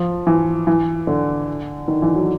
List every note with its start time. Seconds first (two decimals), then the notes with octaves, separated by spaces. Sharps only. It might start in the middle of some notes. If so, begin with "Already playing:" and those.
Already playing: F3
0.27 E3
0.67 E3
1.07 D3
1.88 D#3
2.02 E3
2.15 F#3